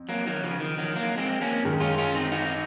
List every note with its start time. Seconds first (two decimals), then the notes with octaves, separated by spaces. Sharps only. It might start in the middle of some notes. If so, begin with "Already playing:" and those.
Already playing: F2
0.09 F#3 A#3
0.27 D#3 F#3
0.43 C#3 F3
0.60 D#3
0.78 D#3 F#3
0.95 F#3 A#3
1.17 G#3 C4
1.41 A#3 C#4
1.63 F#2 D#3 G#3
1.80 C#4 F4
1.98 C#4 F4
2.15 C4 D#4
2.32 D#4 F#4